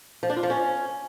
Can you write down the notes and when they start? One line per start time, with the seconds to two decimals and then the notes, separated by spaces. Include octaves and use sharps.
0.23 F3
0.30 D4
0.36 F4
0.43 F3
0.50 C#4